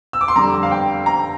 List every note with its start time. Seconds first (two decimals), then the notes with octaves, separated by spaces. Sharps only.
0.13 E6
0.21 D6
0.28 C6
0.36 F2 D3 G3 A#5
0.63 F5
0.71 G5
1.06 A#5